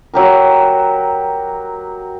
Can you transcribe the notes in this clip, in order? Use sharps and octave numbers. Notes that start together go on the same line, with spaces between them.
F#3 G4 A#4